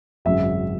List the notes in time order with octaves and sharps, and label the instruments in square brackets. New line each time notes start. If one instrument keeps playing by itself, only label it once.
[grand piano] G#1 F#2 C#3 E5